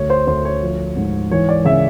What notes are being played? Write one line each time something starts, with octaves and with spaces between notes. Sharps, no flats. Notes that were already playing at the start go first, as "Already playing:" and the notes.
Already playing: D2 C#5
C5
D2 C5
C#5
F3
G#2
E3 C#5
D5
C#3 E5